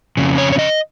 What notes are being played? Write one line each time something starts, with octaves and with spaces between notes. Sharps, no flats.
F2 C#3
C#5
C#5
D#5